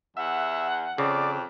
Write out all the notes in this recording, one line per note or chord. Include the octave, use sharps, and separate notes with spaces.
E2 E5 F#5
F2 C#3 D5